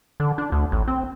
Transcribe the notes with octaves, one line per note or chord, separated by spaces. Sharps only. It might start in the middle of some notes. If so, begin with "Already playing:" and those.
D3
D4
D2
A1
C4